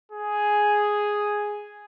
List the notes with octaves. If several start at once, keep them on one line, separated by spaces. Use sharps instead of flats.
G#4